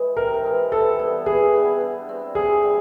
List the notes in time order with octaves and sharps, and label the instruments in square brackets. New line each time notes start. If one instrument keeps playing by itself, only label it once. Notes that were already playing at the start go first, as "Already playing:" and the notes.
Already playing: [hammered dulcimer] E3 G#3
[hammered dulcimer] C3 [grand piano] A#4
[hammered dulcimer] E3 G#3
[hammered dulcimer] E3 [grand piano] A4
[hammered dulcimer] G3 B3 E4
[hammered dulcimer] E3 [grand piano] G#4
[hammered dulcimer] G3 B3 E4
D3
G3 C4
[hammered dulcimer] D3 [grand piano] G#4
[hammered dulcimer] G3 C4